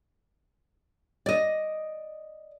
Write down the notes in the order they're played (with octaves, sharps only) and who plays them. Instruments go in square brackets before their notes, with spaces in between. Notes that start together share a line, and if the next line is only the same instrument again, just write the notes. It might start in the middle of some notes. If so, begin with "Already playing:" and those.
[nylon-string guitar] D5 D#5